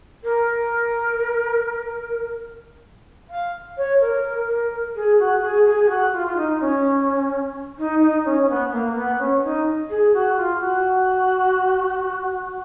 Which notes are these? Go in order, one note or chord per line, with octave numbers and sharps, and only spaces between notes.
A#4
F5
C#5
A#4
A#4
G#4
F#4
G#4
G#4
G#4
F#4
F4
F4
D#4
C#4
D#4
D#4
C#4
C#4
B3
A#3
B3
C#4
D#4
G#4
F#4
F4
F#4